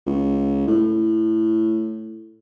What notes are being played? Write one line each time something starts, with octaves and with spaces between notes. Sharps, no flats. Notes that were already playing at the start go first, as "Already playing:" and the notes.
C#2
A2